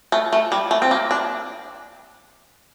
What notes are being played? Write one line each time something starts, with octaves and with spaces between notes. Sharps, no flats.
A3
A3
G3
A3
C4
A#3
D4